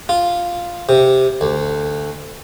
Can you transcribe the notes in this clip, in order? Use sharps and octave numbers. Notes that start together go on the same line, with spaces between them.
F4
C3
D2